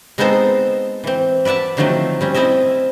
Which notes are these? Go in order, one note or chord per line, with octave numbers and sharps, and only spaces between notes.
G#3 B3 C4 D#4 A4 C5
E3 C4
B4 D5 E5 F#5 A5
D3 D#3 F3 F#3 A3 C4
G3 C4 C#4
C4 E4 A4 D#5 E5